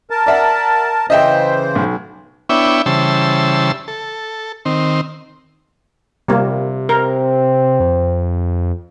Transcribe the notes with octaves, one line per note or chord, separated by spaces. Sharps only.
A#4 A5
D5 E5 F#5
C#3 E3 C5 D#5 E5 G5
B1
B3 D4 E4 C#5 E5 G5
C#3 E3 G3 C5 A5 E6
A4
D#3 C4
C3 G3 A#3
C4 A#4
F2